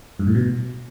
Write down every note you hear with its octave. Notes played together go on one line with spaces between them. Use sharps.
G2
A2
B2